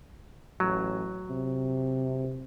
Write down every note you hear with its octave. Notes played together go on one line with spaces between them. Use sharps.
A1 F#3
C3